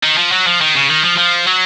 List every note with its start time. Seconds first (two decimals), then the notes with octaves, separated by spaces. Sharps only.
0.03 D#3
0.18 F3
0.32 F#3
0.47 F3
0.61 D#3
0.75 C#3
0.90 D#3
1.04 F3
1.18 F3
1.47 F#3